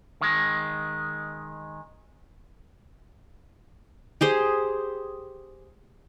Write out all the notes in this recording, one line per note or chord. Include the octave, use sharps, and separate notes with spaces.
D#3 G#3
G4 G#4 C5